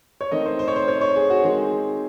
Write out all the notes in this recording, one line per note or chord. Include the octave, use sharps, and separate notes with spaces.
C#5
D#3 A3 C4 D#5
C5
C5
C#5
C5
C#5
C#5
G#4
F#4
D#3 G#3 C4 G#4